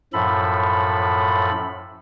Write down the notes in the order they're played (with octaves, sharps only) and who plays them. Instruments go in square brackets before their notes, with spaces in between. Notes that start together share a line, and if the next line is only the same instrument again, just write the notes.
[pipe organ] F#2 A2 F3 A4 B5